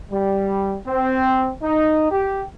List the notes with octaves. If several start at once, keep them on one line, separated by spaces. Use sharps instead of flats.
G3
C4
D#4
G4